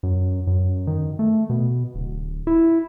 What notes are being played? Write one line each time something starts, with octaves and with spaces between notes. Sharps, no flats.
F#2
F#2
D#3
A3
B2
D1
E4